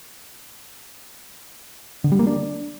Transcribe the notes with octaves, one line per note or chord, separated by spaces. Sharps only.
D3
G3
A#3
D4